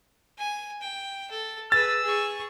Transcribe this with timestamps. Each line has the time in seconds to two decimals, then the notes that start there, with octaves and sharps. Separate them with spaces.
0.38 G#5
0.81 G5
1.30 A4
1.72 G#4 B4 E6 A6
2.03 G#4 C#6